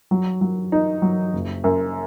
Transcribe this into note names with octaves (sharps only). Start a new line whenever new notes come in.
F#3
F#3
D#4
F#3
F#1
F#2